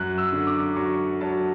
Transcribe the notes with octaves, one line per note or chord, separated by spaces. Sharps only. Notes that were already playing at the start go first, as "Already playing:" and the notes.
Already playing: F#2 F#6
E6
D3
D6
F#3 C#6
F#3 A5